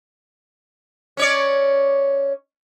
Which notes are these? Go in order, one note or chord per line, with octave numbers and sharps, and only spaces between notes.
C#4 C#5 D5